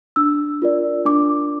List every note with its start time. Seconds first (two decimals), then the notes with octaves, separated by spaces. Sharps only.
0.16 D4 E6
0.62 F4 A#4 D5
1.05 D4 D6